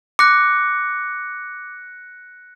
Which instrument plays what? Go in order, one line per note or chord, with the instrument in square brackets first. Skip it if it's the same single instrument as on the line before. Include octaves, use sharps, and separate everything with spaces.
[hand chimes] D6 [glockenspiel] F#6 A#6 C#7